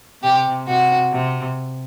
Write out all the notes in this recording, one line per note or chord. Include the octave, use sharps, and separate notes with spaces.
C3 G4
C3 F#4
C3